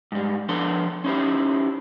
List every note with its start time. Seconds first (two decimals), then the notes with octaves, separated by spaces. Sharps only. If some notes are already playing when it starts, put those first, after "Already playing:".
0.12 G#2 G3
0.49 F3 B3 D4 A4 B4 C6
1.04 C#4 D#4 E4 G4 C5